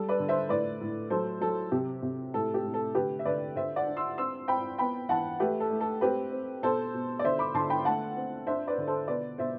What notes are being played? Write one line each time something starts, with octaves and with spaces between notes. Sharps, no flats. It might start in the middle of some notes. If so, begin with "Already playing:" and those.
Already playing: G3 A4
B4 D5
D3
C5 E5
A2 B4 D5
A2
F#3 A4 C5
F#3 A4
C3 G4
C3
A2 A4
G4
A2
A4
D3 G4 B4
E5
D3 B4 D5
D3 C5 E5
D5 F#5
D4
C6 E6
C4 C6 E6
C4 G5 B5
B3 G5 B5
E3 F#5 A5
A3 G4 B4
A4
A3
A4
C4 G4 B4
C4
B2 A4 C5
B2
D5
D3 C5 E5
B5 D6
D3 A5 C6
G5 B5
A3 F#5 A5
C4
D4 C5 E5
B4 D5
D3
A4 C5
B2 B4 D5
B2 C5 E5